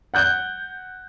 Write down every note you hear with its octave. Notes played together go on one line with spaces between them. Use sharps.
F#5 F#6 G6 G7